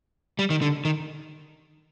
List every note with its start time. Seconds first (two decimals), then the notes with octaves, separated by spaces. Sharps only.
0.39 G3
0.50 D#3
0.62 D3
0.85 D#3